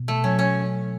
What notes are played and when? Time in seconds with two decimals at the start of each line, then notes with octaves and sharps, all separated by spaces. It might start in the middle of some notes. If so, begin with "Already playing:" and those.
Already playing: B2
0.08 A3
0.24 F#3 C#4
0.39 C#4